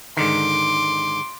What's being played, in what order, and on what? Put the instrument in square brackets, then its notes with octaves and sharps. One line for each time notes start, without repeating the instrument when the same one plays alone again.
[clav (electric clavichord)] G#2 D3 D#3 [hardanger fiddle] C6 D6